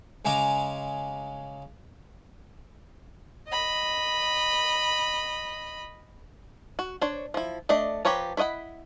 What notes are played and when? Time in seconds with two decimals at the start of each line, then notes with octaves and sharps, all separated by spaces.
0.25 C#3 G#3 G#5 A#5 D6
3.48 D#5 B5
6.79 F#4
7.02 D4 C5 C#5
7.34 F3 E4
7.69 A3 D4 D5 D#5
8.05 F3 G4 B4 C#5 A#5
8.37 E4 C#5 D#5 F#5 B5